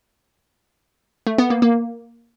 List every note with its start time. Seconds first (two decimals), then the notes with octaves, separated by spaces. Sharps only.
1.27 A3
1.38 B3
1.50 A#3
1.62 A#3